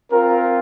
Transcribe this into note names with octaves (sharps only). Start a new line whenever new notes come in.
C4 F4 A#4